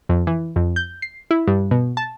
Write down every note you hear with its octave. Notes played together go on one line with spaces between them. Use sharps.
F2
E3
F2
G6
C7
E4
G2
B2
A5